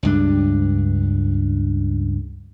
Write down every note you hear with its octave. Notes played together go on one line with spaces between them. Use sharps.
C#2 G2 D4